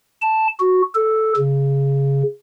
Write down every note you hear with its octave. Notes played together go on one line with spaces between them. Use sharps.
A5
F#4
A4
C#3